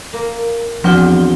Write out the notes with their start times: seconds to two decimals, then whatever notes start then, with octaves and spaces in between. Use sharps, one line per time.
0.13 A#3
0.84 E2 F3 C4 D4 F#4 F#5 G7